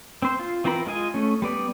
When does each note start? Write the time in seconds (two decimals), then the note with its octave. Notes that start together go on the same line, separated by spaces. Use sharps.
0.22 C4 C5
0.40 F4
0.64 E3 C4 F4 A#4 B5
0.86 G#3 F4 D#5 G#5
1.14 A3 C#4
1.42 G3 B3 D5